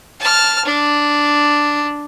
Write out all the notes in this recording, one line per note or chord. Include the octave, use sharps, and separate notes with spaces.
A5 F6
D4